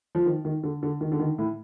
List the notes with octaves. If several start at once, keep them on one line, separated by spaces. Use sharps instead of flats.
F3
D#3
D#3
D3
D3
D#3
D3
D#3
A2